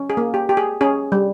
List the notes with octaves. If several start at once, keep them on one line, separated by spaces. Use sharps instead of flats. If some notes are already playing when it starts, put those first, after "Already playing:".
Already playing: C#4
G#4
A#3
G4
G4
G#4
C#4 G#4
G3